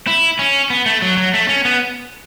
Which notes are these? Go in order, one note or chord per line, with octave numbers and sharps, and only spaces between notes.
E4
C#4
B3
A3
F#3
F#3
A3
C#4
B3